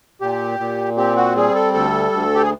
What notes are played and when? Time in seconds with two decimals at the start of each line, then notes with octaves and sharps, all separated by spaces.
0.21 A#2 G4
0.59 A#2
0.97 C4 G4
1.16 F#4
1.36 G3 G#4
1.55 A4
1.73 D2 A4
2.12 D2
2.35 G4
2.43 G#4